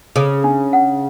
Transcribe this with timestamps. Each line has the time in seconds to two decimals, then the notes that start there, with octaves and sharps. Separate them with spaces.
0.16 C#3 G#4
0.44 D4
0.73 F#5